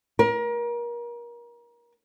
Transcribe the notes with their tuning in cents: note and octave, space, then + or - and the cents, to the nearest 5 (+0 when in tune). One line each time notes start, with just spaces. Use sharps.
A#4 +30